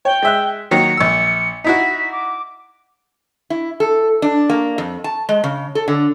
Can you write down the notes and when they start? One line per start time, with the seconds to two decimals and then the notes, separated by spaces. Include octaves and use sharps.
0.05 C#5 G5
0.22 G#3 E5 F#6
0.71 D#3 F#3 A#3 C#7
0.97 A#1 E6
1.64 D#4 E4 F#4 B6
2.12 D6
3.50 E4
3.80 A4
4.22 D4
4.50 A#3
4.78 F2
5.04 A5
5.29 G#3
5.44 C#3
5.75 A4
5.88 D3